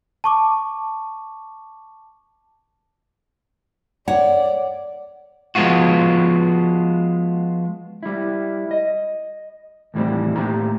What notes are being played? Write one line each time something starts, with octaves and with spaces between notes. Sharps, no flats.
A5 C#6 D6
C#5 D5 F#5
F3 G#3 B3 F4 F#4
G3 E4
D#5
D#2 A2 E3 G3 C4
A2 A#3 G4 A#5